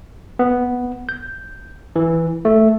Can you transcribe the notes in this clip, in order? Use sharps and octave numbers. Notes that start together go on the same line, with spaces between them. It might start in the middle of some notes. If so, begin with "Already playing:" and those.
B3
G6
E3
A3